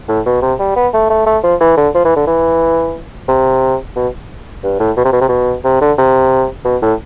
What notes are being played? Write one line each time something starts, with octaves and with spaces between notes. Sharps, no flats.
A2
B2
C3
G3
B3
A3
A3
A3
F3
E3
D3
F3
E3
D3
E3
C3
B2
G2
A2
B2
C3
B2
C3
B2
C3
D3
C3
B2
A2